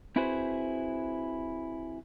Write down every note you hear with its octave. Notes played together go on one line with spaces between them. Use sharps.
C4 E4 F#4 G#4 B4 C5